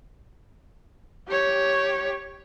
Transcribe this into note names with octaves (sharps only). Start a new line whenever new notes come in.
G4 C#5